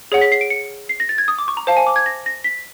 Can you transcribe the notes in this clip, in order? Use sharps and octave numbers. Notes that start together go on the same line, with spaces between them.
G#4 C#5 F#5
B6
C7
D7
C#7
C7
A#6
A6
G#6
D#6
D6
C#6
A#5
C5 F5 A5
G#5
D6
G#6
A#6
A#6
B6